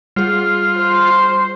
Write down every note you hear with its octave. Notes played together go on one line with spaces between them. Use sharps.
G3 F4 G#4
C5